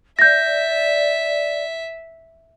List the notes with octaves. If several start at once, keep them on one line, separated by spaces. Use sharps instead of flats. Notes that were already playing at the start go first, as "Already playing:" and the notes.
D5 E5 G6 A#6